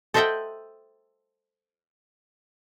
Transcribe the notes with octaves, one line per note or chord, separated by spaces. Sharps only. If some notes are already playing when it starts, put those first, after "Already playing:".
A4 C5 D#5 E5 F#5 G5